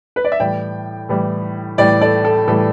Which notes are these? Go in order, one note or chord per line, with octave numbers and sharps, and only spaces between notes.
B4
D5
E5
A2 E3 G3 D5 G5
A2 E3 G3
A2 E3 G3 D5 G5
A4 D5
A4
A2 E3 G3 A4